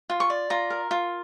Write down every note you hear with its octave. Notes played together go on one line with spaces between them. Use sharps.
F4
C#6
D5
F4 A#5
A#4
F4